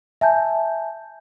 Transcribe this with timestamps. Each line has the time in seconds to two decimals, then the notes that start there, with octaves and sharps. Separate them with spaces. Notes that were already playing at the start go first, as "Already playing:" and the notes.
0.21 E5 G#5 A5 G6